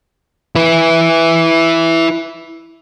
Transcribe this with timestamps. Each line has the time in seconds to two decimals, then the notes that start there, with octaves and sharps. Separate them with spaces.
0.56 E4 B4